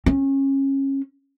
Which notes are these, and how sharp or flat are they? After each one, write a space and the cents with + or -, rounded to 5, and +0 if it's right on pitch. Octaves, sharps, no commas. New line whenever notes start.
C#4 -25